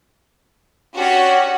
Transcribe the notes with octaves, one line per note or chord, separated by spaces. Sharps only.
C#4 D4 F#4 G4